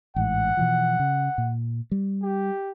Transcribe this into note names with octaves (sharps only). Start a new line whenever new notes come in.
A1 G#2 F#5
B2 E3 F3
C#3
A#2
G3
G4